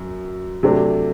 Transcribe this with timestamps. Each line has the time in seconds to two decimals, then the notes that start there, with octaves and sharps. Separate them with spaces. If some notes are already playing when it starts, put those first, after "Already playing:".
Already playing: F#2 F#3
0.63 C3 F#3 A3 D4